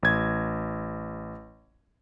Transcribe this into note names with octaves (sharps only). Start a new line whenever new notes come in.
A1 G#6